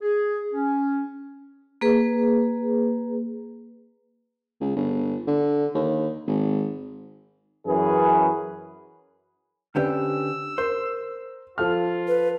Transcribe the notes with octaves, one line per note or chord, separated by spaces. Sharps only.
G#4
C#4
A#3 G#4 B4
C#2
G1
D3
D#2
G#1
F#2 E3 C#4 G#4 B4
D3 C4 C#4 G4 B4 D5 E6
A#4 C5
F3 F4 A4 F6
B4